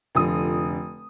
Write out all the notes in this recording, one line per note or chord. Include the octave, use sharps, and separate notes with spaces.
F1 D3 F3 D#6